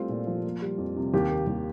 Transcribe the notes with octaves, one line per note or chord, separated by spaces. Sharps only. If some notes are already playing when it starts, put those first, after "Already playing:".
Already playing: G3 A3 C4 F4
A#2
F3
A#3
G3
F2
C3
D#2 G4
A#3
D#2